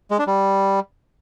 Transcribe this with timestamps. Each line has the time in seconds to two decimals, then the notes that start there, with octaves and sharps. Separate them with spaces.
0.11 G#3
0.19 D4
0.27 G3